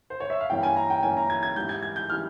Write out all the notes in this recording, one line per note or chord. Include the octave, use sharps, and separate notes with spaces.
C5
C#5
E5
F5
G2 E3 A#3 C#4 G5
G#5
A#5
G5
G2 E3 A#3 C#4 G#5
A#5
G#6
G#6
G#2 E3 G3 G6
G#6
G#6
G6
E3 G3 F6